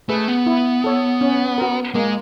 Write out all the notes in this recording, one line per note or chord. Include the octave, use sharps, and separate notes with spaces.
A3 G#4 B4
B3
E4
A4 C#5
C#4
F#4 A#4
G#3 A#3